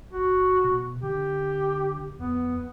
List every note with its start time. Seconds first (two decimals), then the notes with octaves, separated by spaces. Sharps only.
0.13 G1 F#4
0.64 B2
1.03 D3 G4
2.19 F2 B3